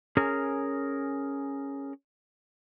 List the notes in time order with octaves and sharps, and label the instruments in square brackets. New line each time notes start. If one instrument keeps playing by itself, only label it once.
[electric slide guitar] C#4 G#4 A#4